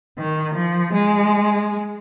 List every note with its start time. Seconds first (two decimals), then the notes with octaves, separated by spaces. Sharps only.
0.16 D#3
0.55 F3
0.93 G#3